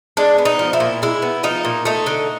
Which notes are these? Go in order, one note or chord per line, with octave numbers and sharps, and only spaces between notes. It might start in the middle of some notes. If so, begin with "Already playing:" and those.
G#3 D4
B3
D#4
F3
E4
A#2
G#3 E4
B3
F3 D#4
A#2
A3 D#4
D3